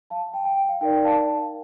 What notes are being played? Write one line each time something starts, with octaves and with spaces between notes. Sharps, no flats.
F5 A5
G5
G5
G5
F5
D#4 A#4 D5 G5
F5 A5